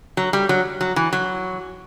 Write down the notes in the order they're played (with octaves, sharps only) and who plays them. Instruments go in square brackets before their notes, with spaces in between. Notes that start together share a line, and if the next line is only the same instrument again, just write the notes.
[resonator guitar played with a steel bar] F#3
G3
F#3
F#3
E3
F#3